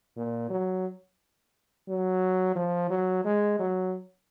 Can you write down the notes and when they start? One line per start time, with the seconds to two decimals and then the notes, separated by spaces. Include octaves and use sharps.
0.17 A#2
0.50 F#3
1.88 F#3
2.56 F3
2.90 F#3
3.25 G#3
3.59 F#3